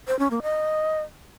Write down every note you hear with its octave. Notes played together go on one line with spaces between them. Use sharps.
C5
C#4
A#3
D#5